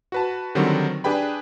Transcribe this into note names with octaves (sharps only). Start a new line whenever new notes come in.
F#4 B4 A5
D3 D#3 F#3 G3 C4 F#4
D4 G4 G#4 B4 G5 B5